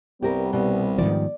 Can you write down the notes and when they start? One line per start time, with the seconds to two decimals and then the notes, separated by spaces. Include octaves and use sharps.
0.22 C2 G3 B3 G4 A#4
0.53 C2 B2
0.98 G#2 D#3 F3 D5